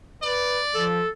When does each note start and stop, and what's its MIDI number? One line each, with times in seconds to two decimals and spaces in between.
0.23 0.60 71
0.23 0.85 74
0.75 1.03 53
0.75 1.09 69